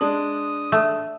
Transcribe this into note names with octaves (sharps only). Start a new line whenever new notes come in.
G#3 D4 D#6
A3